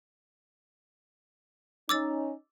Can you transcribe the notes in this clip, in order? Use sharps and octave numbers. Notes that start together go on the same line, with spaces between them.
C#4 D#4 D6 E6 A6